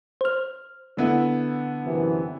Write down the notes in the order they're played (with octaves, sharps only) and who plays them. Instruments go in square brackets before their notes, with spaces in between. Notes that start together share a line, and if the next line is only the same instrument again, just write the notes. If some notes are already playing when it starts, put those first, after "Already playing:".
[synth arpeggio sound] C5 F6
[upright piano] D3 B3 E4
[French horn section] F#2 C3 E3